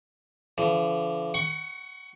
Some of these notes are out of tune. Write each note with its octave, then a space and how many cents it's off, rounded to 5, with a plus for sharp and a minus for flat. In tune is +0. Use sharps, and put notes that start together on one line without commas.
D3 -35 F3 -45
F#5 +25 C#6 +0